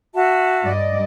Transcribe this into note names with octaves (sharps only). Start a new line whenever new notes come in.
F#4 E5 A5
G2 D5 D#5